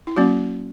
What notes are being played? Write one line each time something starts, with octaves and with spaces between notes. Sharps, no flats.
E4
F#3 A#3 C#4 F#4